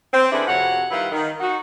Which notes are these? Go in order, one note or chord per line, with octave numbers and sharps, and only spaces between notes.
C4
D3 C#4 D4 E4 G#4 B4
F2 C3 F#4 C#5 F#5
D#3 G3 E4 F4 B4 F#5
D#3
D#4 F#4